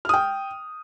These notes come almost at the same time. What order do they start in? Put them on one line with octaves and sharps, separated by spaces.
F6 D#6 G5